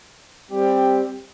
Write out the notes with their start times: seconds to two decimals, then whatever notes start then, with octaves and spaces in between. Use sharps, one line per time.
0.51 G3 C4 G4